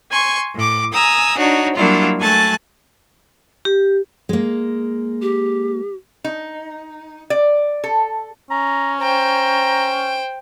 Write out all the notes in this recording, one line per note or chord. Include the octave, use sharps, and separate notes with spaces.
G#5 C6 C#6
A2 D6
G#5 A#5 D#6 E6
D4 D#4 F#4 C#5
F#3 G3 A#3 D4 E4 F4
F#3 A3 G#5 A5 F#6 A6
G4
G#3 A#3
G4
D#4
D5
A4
C#4 A#5
C5 G5 A#5